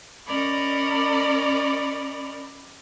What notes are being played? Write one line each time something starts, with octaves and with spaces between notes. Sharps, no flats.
C#4 A#4 D5 D#5 B5